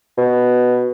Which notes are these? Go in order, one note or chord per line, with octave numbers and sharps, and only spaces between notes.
B2